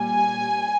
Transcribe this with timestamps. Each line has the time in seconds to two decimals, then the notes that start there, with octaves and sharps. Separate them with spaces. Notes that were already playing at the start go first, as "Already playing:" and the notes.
Already playing: A#2 G3 G#5